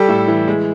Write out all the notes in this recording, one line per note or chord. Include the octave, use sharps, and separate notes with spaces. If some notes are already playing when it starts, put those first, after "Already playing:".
Already playing: G3 G4 A4
A2
E3
G#3